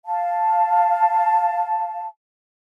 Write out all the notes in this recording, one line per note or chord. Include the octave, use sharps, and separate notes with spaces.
F5 A5